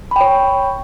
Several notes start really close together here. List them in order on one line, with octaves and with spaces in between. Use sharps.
B5 G5 C#5